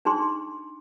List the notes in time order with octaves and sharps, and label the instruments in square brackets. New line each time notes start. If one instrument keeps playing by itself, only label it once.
[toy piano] D4 D#4 G#4 C6